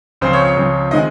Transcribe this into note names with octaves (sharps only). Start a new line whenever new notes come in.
C#2 C#3 F3 C4 C5
C#5
C#5
C#2 C#3 F3 C4
D#3 G#3 C4 D#5